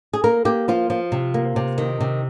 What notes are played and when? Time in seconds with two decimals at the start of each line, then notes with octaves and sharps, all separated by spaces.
0.13 G#4
0.24 A#3 A#4
0.45 A#3 G4
0.68 F3 F4
0.90 F3
1.12 C3
1.34 A#3
1.56 C3
1.78 D#3
2.01 C3